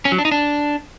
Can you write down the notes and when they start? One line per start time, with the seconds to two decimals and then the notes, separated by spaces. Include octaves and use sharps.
0.05 C#4
0.12 F#3
0.18 D4
0.25 D#4
0.31 D4